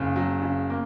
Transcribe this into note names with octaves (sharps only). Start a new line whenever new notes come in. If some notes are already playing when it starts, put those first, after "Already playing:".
Already playing: F#1 C#3
F#3
C#3
A#3